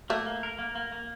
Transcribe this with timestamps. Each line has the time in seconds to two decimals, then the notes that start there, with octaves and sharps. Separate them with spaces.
0.10 A3 A#3
0.26 A#3
0.43 A#4
0.59 A#3
0.75 A#3
0.92 A#3